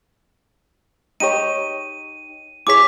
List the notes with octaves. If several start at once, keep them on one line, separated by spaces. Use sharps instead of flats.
D#4 G4 C#5 D#7
E4 G#4 C#5 D6 B6